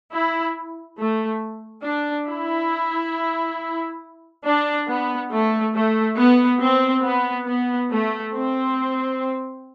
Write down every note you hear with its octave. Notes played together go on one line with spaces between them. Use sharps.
E4
A3
D4
E4
D4
B3
A3
A3
B3
C4
B3
B3
A3
C4